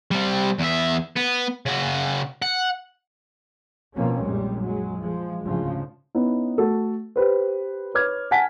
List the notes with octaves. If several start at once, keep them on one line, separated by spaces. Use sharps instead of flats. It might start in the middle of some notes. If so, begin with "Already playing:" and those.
G3 C4
E2 E5
B3
C#3 F#4
F#5
B2 D#3 F3 A#3 C4 C#4
A#1 F#2 G3 G#3
F#3 G#3
F3 G#3
D2 G#2 C#3 F3
B3 C#4 D#4 E4
A3 F#4 A4
G4 B4 C5
B4 C#5 D6 F6 G#6
F#5 G#5 A5 B6